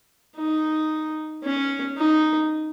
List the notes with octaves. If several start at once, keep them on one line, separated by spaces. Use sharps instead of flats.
D#4
C#4
D#4